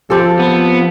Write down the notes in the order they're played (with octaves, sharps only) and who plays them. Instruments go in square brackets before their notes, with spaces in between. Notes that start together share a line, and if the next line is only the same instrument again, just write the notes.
[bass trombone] F3 [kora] C4 G4 A4
[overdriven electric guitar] B3